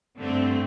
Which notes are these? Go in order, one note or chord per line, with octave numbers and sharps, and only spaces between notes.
G2 D3 A3 C4